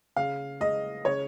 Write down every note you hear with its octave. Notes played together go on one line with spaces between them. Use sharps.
C#3 F5
G#3 D#5
C#3 C#5